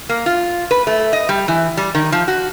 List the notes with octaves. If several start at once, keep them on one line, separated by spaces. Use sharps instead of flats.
A#3
F4
B4
A3
D#5
G3
E3
G3
D#3
F3
F#4